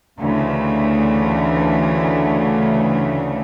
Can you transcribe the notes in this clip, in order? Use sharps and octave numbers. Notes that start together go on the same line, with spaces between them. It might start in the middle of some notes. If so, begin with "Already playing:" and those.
D2 C#3 E3 A3